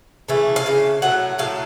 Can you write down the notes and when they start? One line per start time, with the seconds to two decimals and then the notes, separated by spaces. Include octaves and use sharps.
0.29 C#3 E3 A3
0.56 F5
0.66 C#3 E3
1.02 A2 F#3 A3 F#5
1.39 A2 F#3 A3 F5